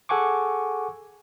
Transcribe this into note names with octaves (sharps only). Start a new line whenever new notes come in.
G#4 A4 F#5 G#5 C#6 D6